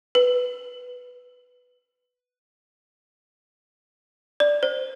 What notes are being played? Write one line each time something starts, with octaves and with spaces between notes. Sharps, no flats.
B4
D5
C5